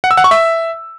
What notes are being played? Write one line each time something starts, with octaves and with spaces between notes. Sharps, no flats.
F#5
E6
F#5
C#6
E5